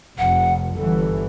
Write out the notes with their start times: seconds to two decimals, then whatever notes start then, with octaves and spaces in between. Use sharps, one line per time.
0.18 F1 F#5
0.76 G1 E3 A4